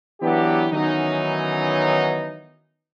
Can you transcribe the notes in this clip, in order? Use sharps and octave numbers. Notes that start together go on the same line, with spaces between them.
E3 F#3 B3 D4 G4
D#3 E3 F#3 B3 C#4 D#4